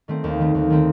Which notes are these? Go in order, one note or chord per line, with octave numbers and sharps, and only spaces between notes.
D#3 A3 C4
D#2
D#3 A3 C4
D#2
D#3 A3 C4